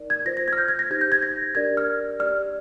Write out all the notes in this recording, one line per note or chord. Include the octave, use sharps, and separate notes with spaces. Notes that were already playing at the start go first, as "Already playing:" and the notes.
Already playing: D#4 A#4 D5
G#6
F4 C5 A#6
A#6
G#6
F6
G6
G#6
A#6
D#4 G4 C5 G#6
G6
G#6
A#6
D4 G4 A#4 D5 G#6
F6
G4 D5 F6